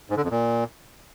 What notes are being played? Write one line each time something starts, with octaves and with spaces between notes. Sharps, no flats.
G#2
D3
F2
A#2